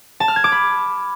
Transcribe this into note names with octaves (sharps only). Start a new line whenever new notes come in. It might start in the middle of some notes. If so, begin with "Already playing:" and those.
A5
F6
G#6
D6
B5